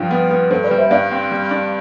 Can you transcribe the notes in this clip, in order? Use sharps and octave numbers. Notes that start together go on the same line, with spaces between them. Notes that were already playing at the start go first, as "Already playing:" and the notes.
Already playing: G2 F3 F4 G4
B3
B3
G2 A4 C5
B4 D5
G3
C5 E5
G2 D5 F5
C4
G3
D4